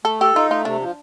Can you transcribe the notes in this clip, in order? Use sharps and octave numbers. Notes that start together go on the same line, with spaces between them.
A3 A4
G4 A4
D#4 F4
A3 F4
C3 D4
F3